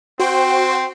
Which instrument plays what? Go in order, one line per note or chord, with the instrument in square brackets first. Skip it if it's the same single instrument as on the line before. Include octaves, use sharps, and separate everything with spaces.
[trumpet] C4 [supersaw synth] F#4 C5 G5